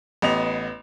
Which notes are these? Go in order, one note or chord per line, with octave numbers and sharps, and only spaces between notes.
A1 B3 D#5 F7